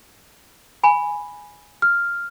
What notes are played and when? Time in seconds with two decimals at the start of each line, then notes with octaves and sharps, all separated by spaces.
0.84 G#5 B5
1.82 F6